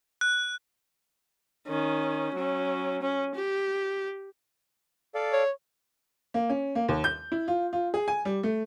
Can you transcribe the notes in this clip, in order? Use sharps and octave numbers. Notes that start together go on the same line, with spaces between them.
F#6
D#3 C#4
F#3 C#4
C#4
G4
A4 D5 F5
C#5
A#3
C#4
A#3
D#2
G6
E4
F4
F4
G#4
G#5
G3
A3